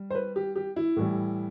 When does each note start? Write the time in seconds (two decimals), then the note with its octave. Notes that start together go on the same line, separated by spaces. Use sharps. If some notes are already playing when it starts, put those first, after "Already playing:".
Already playing: G3
0.10 C5
0.15 B4
0.36 G4
0.56 G4
0.76 E4
0.96 A2 E3 G3